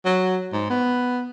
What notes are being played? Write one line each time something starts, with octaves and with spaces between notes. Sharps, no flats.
F#3
G#2
B3